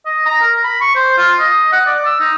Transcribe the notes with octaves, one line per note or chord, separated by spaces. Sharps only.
D#5
A#5
A#4
B5
C#6
C5
F4
D#5
F#5
D5
E6
D#4